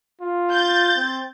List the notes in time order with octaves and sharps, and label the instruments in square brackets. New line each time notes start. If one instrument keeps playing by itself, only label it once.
[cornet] F4
[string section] G6 A6
[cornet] C4